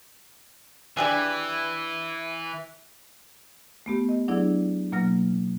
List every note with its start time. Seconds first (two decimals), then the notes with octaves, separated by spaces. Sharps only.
0.97 E3 D4 G4 G#4
3.86 A3 B3 G4
4.09 D#5
4.28 F#3 D4 E4 G#4 D5
4.92 B2 F#3 A#3 F6 A#6